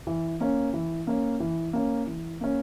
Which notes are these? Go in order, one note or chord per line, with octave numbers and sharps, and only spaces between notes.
E3
A#3 C#4
E3
A#3 C#4
E3
A#3 C#4
E3
A#3 C#4